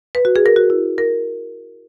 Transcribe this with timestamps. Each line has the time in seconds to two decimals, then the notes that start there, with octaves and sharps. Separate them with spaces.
0.15 B4
0.25 F#4
0.36 G#4
0.46 A#4
0.56 F#4
0.70 E4
0.98 A#4